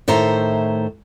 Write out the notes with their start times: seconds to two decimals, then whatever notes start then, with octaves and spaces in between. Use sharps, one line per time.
0.08 A2 D#3 C5 E5 A#5